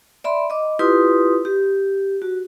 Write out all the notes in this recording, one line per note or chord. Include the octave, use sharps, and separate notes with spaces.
D5 E5 B5 C6
D#5 D6
E4 F4 G4 B4 C6 D#6
G4
F#4